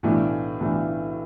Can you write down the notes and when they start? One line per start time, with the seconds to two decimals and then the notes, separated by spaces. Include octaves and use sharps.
0.03 B1 A2 E3 A3 D4
0.60 B1 A2 E3 A3 D4